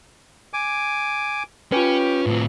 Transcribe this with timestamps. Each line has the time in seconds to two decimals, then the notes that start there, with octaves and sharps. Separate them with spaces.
0.53 G#5 D6
1.72 C#4 F4 G4 B4 G5
2.26 A2 C4